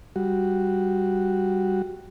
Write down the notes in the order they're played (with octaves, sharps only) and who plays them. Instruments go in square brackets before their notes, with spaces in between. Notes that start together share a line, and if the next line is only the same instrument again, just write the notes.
[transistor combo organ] G3 F#4